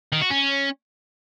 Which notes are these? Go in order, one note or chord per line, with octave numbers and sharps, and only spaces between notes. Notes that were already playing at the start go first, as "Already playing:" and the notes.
D#3
F#4
C#4